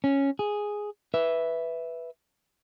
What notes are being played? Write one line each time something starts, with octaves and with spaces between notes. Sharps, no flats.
C#4
G#4
B4 E5